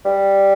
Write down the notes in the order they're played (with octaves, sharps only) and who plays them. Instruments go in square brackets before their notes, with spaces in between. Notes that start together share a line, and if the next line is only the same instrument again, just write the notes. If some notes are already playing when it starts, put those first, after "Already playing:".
[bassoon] G3